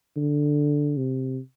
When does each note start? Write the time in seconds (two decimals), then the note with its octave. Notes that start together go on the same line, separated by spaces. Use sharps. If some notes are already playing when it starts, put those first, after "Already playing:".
0.17 D3
0.97 C3